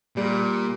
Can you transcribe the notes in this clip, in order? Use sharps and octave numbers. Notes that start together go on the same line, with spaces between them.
A#2 G3